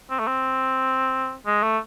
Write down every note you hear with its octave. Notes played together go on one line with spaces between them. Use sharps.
C4
A3
C4
G#3
A3